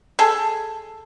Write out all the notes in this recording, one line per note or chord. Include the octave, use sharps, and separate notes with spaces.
G#4 A4